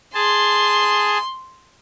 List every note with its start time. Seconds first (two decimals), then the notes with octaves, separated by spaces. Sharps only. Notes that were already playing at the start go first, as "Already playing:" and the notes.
0.14 G#4 A5 C6